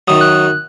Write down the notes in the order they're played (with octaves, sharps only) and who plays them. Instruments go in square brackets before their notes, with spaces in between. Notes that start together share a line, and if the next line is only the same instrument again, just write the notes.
[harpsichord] F#2 D#3 F#3 [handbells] D#6
[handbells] F#6